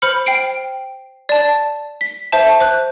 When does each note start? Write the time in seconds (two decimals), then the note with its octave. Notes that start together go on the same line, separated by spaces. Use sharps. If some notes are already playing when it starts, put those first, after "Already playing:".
0.02 C5 B5 F6 C#7
0.26 G5 C7 D7
1.29 D5 A5
2.01 B6
2.32 C5 E5 A5
2.60 C5 F#6